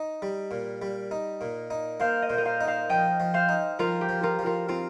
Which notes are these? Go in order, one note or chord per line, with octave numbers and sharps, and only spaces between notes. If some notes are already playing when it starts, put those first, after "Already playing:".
Already playing: D#4
G3
A#2
G3
D#4
A#2
D#4
A#3 C5 F5
D#5
A#2 C5
A#4 D#5
C5 F5
D#4
C5 F5
F3 D#5 G5
F3
C5 F5
D#4
F3 F4 A#4
G4
F3
F4 A#4
F3
F4 A#4
C4 F4